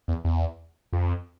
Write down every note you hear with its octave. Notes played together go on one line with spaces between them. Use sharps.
E2
E2
F2